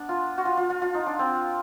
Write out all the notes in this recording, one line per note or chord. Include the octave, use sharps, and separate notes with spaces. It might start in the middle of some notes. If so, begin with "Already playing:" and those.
Already playing: B3 D4
F4
F#4
F4
F4
F4
F4
D#4
D4
C4